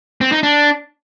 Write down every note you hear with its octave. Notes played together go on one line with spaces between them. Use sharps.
C4
D#4
D4